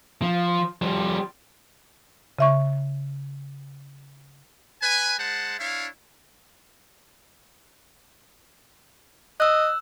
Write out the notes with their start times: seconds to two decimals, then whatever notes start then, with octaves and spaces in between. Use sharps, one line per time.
0.22 F3
0.82 F3 G3
2.39 C#3 E5 C#6
4.82 B4 G#5
5.19 G#3 C5 F#5 A5
5.59 D4 E4 C#5 F5
9.40 D#5 E6 F#6